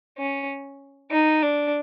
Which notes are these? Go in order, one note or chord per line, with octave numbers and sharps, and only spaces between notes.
C#4
D#4
D4